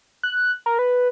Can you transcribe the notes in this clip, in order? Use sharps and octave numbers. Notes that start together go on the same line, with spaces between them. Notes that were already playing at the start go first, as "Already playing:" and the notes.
F#6
A#4
B4